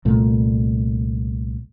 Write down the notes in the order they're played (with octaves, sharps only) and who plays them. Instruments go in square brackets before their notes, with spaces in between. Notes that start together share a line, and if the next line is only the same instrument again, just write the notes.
[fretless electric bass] C2 A#2 A3